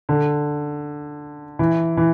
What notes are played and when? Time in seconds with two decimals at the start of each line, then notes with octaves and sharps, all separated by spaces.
0.09 D3
1.59 E3
1.97 E3